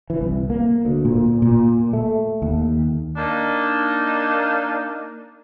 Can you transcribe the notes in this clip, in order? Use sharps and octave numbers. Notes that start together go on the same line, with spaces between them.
E3
C2
A#3
D2
A#2
A#2
A3
D#2
A#3 D4 D#4